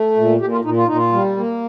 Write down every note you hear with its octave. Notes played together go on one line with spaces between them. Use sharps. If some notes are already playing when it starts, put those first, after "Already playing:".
Already playing: A3
A#2
A#2 G4
F4
A#2 D#4
F4
A#2 D#4
F4
G3
A#3